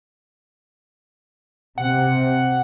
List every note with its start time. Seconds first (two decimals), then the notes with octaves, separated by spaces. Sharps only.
1.78 C3 F#5